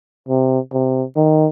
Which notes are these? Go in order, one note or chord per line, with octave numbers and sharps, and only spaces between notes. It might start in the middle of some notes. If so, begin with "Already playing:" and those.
C3
C3
D#3